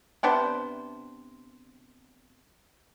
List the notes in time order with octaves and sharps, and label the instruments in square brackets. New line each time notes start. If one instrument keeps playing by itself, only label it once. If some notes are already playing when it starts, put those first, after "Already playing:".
[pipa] C3 B3 D4 C5